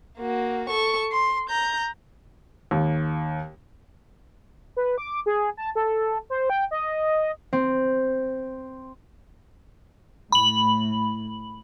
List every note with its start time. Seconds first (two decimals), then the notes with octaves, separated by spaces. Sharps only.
0.18 A#3 F#4
0.69 A4 C#6
1.12 C6
1.50 A#5 G6
2.71 D#2
4.77 B4
4.98 D6
5.26 G#4
5.57 A5
5.75 A4
6.30 C5
6.50 G5
6.71 D#5
7.53 C4
10.32 A2 B5 F#7